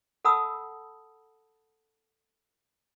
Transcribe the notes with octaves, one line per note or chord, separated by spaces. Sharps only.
A4 F#5 A5 B5 D#6 E6